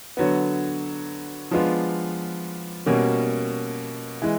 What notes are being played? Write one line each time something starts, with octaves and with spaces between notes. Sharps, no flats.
D3 F#3 B3
F3 G#3 B3 D4 F4
B2 G3 A#3 C#4 F#4
E3 G#3